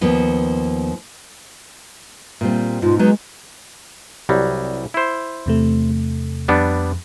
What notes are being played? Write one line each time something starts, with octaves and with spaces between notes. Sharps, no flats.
D#2 F3 B3
A#2 G3 C4
G#2 B2 F4
F#3 G#3 B3 D#4
C2 F#3 G3
E4 C5
E2 C3 A3
F2 G3 B3 D4